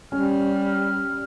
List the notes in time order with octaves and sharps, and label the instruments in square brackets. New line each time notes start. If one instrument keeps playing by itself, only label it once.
[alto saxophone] G3 [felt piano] C#4 [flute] F6